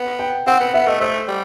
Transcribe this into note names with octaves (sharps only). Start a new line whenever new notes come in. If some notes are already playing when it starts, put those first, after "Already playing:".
Already playing: B3 F#5
G5
C4 F#5
B3
B3 E5
A3 D#5
A3 C5
G3